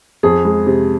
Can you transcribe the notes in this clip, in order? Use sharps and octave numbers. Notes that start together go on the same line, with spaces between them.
F2 G#4
G#3
C3